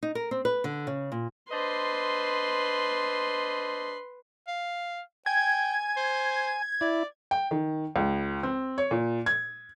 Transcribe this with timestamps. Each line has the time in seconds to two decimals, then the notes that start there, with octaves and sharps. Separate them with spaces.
0.03 D#4
0.15 A#4
0.31 C4
0.45 B4
0.64 D3
0.87 C#3
1.12 A#2
1.51 D4 B4 C5 D#5 C6
4.47 F5
5.26 G5 G#5 G#6
5.97 C5
6.81 E4 D5
7.31 G5
7.51 D#3
7.96 C#2
8.43 C4
8.78 C#5
8.91 A#2
9.26 G#6